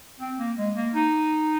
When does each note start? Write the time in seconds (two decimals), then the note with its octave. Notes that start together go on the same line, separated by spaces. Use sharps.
0.20 C4
0.39 A#3
0.57 G#3
0.76 A#3
0.94 D#4